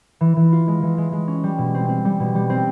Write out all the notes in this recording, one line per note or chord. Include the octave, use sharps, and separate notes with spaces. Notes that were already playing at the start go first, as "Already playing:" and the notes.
E3
E3
F4
G#3
E3
G#3
G#3
C#4
G3
B2
C4
C4
G3
B2
G3
C4